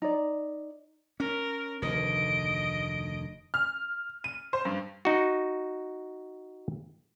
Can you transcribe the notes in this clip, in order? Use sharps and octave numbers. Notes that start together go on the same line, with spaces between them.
D#4 D5
C#4 A#4
F1 D2 D#3 D#5 D7
F6
D#7
C5
G2
D#4 F#4